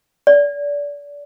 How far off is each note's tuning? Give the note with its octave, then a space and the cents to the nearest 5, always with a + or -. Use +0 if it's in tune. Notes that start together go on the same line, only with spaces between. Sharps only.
D5 -25